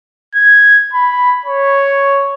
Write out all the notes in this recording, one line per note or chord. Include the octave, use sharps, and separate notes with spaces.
G#6
B5
C#5